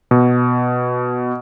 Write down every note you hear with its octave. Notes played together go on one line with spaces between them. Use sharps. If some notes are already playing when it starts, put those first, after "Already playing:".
B2